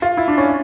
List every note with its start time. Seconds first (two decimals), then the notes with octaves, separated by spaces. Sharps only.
0.02 F4
0.17 E4
0.28 D4
0.38 C#4